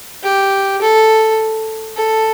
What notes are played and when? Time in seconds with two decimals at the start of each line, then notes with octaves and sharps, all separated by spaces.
0.23 G4
0.81 A4
1.96 A4